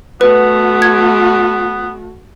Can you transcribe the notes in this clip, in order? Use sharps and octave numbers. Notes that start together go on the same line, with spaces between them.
A3 B3 F#4 B4
G#6